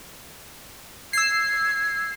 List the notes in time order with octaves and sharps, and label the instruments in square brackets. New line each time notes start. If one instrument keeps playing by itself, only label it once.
[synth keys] E6 C7 [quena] G#6